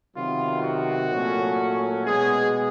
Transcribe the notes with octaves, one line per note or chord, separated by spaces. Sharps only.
C3 D#3 F#3 B3 F4
F#4
A#2 F#3 A3 C#4
B2 G#3 B3 G#4